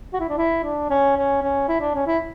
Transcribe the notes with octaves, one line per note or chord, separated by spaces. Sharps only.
F#4
E4
D4
E4
D4
C#4
C#4
C#4
E4
D4
C#4
E4